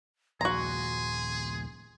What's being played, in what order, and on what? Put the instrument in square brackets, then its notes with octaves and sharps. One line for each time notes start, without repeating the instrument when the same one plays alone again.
[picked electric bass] D#2 A#2 F3 [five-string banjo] F#4 A#5 [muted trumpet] G#4 [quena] C6